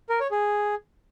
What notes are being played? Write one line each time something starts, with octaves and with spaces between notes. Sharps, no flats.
A#4
C#5
G#4